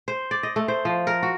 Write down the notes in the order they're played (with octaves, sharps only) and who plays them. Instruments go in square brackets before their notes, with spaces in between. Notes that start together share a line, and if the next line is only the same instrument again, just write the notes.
[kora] C5
D5
D#5
A3
C5
F3
A#4
F#4